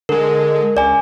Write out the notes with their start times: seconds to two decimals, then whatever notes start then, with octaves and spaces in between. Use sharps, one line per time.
0.09 D3 G#3 A#4
0.77 C#2 D5 G#5